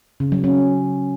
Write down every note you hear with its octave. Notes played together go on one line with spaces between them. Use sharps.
C#3
F#3
C#4